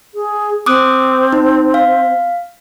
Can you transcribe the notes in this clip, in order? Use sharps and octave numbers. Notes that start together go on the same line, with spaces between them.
G#4
C4 D6 D#6 F#6
D#4
F5